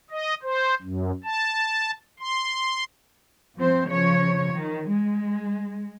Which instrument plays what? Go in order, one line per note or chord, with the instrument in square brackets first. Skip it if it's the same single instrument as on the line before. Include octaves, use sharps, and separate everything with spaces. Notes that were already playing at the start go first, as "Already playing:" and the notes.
[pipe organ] D#5
C5
F#2
A5
C6
[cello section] F3 C4 C5
C#3 F3 C#5
D#3
G#3